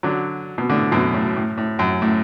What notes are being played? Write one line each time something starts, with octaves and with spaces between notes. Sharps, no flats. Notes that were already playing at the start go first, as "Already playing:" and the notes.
D3 F#3
B2
A2 D3
F#2 B2
A2
A2
A2
F#2
A2